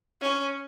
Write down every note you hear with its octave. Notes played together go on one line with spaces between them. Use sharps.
C#4